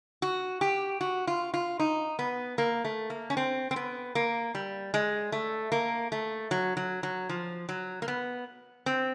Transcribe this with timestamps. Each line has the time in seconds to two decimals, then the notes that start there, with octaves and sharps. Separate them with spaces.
0.22 F#4
0.61 G4
1.01 F#4
1.27 F4
1.54 F4
1.79 D#4
2.19 B3
2.58 A#3
2.84 A3
3.10 A#3
3.30 C#4
3.37 C4
3.71 C4
3.76 B3
4.15 A#3
4.55 G3
4.94 G#3
5.32 A3
5.72 A#3
6.12 A3
6.51 F#3
6.77 F#3
7.03 F#3
7.29 F3
7.69 F#3
8.02 A#3
8.08 B3
8.86 C4